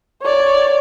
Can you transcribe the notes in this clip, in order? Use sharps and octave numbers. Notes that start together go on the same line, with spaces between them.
C#5 D5